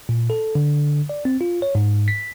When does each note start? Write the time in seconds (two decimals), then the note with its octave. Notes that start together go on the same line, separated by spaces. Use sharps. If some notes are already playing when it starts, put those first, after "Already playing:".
0.09 A#2
0.30 A4
0.55 D3
1.09 D5
1.25 C4
1.41 F4
1.62 C#5
1.75 G#2
2.08 B6